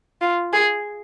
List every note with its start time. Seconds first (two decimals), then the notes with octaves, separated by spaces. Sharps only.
0.22 F4
0.53 G#4